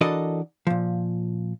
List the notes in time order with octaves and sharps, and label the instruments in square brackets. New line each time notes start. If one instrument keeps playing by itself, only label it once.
[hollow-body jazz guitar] E3 D4 F#4 A4 A#4 D#5
A#2 F3